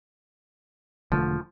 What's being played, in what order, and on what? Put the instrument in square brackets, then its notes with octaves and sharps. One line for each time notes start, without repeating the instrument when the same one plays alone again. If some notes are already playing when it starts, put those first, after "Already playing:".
[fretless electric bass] E1 D3 A3 [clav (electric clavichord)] F3